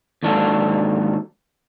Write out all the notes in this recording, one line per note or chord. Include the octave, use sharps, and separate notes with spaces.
D#2 G#2 F#3 D4 A4